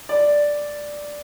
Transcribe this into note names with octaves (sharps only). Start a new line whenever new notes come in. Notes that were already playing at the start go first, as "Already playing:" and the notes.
D5